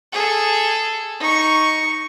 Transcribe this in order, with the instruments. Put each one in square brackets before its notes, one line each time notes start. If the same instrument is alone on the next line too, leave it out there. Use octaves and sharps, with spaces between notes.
[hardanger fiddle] G#4 A4
D#4 C#6